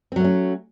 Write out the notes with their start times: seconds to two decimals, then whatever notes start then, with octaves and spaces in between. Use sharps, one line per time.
0.12 C4
0.16 F#3
0.20 A3
0.24 C#4